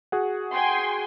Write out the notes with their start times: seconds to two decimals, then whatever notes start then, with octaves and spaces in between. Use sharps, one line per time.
0.12 F#4 G#4 F#5
0.53 G5 G#5 C6